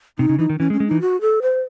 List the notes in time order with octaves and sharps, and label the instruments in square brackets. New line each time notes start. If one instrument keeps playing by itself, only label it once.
[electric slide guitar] C3 [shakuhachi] D#4
[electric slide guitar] C#3
[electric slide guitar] E3 [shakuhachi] D#4
[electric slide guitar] D#3
[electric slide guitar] E3 [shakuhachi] C#4
[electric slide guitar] G#3
[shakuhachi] C#4
[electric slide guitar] G#3
[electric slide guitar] E3 [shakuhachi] D#4
[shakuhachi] F#4
A4
C5